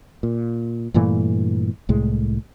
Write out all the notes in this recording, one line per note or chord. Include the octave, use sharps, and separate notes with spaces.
A#2
G2 A#2 E3 A3
C2 A2 G#3